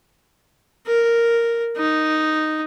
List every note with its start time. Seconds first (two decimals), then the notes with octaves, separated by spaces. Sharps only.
0.87 A#4
1.77 D#4